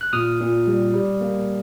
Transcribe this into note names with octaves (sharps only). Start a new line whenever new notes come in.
F#6
A#2 D#6 F6
A#2
G3
G3
A#3